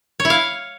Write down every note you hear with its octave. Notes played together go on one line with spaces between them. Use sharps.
C#5
E4
F5